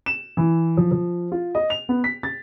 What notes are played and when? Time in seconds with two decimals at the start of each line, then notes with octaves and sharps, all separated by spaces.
0.06 E7
0.37 E3
0.77 F3
0.91 F3
1.32 F4
1.55 D#5
1.70 F7
1.89 B3
2.04 B6
2.23 A6